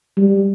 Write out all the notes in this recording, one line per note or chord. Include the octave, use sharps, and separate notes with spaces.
G3